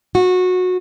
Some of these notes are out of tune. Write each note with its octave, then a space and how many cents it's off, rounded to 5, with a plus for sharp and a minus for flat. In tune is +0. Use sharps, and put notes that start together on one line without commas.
F#4 -20